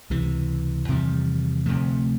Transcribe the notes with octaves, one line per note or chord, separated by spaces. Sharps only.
C#2 C3 E3
E2 C3 D#3 G3
D2 C3 F3 A3